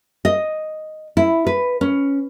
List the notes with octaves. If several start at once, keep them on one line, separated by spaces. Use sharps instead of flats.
D#5
E4
B4
C#4